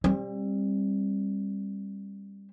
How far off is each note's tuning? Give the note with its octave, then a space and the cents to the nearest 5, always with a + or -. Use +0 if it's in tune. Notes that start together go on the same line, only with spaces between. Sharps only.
G3 +20 C4 +40